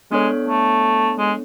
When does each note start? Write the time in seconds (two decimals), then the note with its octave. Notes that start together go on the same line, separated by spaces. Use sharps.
0.11 G#3 B3 D4 A4 C#5
0.48 A3
1.18 G#3